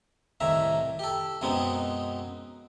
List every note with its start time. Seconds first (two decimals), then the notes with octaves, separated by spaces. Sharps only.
0.40 C2 A2 D#3 E5 A#5
0.99 G4 A4
1.41 F#2 B2 G#3 B3 C4 D#4